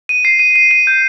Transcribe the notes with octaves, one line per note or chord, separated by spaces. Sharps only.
D#7
C7
D#7
D#7
D#7
G6